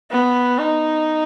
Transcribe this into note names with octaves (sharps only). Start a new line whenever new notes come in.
B3
D#4